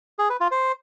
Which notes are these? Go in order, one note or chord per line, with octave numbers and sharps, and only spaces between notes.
G#4
B4
F4
C5